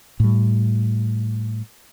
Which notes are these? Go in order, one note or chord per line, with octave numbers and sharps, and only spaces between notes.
A2 G3